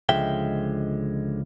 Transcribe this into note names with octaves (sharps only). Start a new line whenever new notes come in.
C#2 D3 F3 G#3 E5 G5